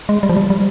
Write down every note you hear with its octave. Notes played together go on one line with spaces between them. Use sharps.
G#3
G3
F3
G3
G3